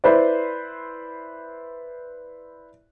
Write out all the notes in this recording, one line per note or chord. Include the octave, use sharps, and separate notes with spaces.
E4 B4 C5 D5